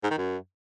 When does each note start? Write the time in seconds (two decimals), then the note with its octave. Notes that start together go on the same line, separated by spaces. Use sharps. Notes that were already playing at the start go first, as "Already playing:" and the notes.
0.04 G#2
0.11 D#3
0.18 F#2